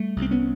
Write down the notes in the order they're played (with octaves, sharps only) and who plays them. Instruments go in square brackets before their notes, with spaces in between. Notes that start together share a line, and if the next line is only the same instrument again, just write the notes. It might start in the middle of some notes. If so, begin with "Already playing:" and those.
Already playing: [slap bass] G3 A3
C2
C4
B3 C#4